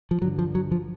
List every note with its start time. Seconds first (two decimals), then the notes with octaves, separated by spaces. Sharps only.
0.11 F3
0.21 G2 D3 F#3
0.39 F3
0.55 F#3
0.71 F3